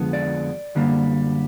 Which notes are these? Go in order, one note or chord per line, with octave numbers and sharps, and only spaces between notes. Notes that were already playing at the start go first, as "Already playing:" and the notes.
Already playing: F2 D3 F3 G#3 B3
D5
F#2 D3 G3 A#3